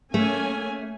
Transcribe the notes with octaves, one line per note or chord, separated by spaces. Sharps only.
A3 A#3 C#4 G#5